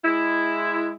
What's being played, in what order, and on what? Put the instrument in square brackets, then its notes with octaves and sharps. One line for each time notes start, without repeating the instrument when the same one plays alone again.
[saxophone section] G#3 E4